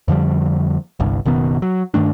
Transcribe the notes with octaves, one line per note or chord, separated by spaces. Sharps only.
F2 D3 F3 G3
G1 C2 G2
F#1 B2 D#3 B3
F#3
G2 D#3 A3 D4